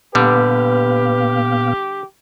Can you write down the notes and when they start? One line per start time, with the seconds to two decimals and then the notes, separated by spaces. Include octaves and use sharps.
0.15 A#2 D3 G3 B3 G4 B4 F5